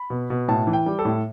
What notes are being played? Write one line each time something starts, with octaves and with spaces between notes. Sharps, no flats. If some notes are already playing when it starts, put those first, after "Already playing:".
Already playing: B5
B2
B2
A2 A5
E3
G5
G3
A4
A2